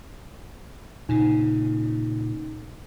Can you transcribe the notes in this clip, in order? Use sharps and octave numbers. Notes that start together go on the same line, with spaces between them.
A#2 C#3 D#4